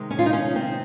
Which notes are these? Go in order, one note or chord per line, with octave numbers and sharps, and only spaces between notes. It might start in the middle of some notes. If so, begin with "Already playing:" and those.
Already playing: C3 D#3 G#3
C#4
F4
D#4
C#4
C4